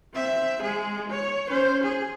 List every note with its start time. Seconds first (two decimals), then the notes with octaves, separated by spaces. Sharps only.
0.13 C4 E5
0.63 G#3 G#4
1.10 C#5
1.48 C#4 C5
1.84 G#4